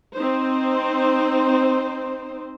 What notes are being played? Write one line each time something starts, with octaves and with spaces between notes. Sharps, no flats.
C4 D#4 C5